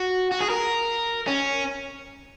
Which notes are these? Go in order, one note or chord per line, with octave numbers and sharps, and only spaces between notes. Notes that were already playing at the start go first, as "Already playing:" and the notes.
Already playing: F#4
F#4
G#4
A#4
C#4